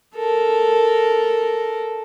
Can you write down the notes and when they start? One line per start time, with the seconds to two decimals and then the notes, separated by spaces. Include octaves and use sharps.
0.15 A4 A#4